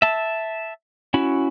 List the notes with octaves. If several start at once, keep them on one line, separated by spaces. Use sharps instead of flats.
E5 A5
C#4 E4 F#4